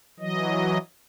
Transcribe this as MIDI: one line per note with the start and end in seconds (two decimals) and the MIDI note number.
0.20 0.78 52
0.20 0.78 54
0.20 0.78 75